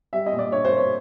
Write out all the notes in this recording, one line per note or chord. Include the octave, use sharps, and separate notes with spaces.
G3 E5
D#5
A#2
D5
D4 C#5
C5
A#3
C#5